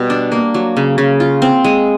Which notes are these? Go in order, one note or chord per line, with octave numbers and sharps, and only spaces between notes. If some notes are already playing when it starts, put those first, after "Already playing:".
Already playing: B2 G3
D4
A#3
F#3
C#3
C#3
F4
C4
G#3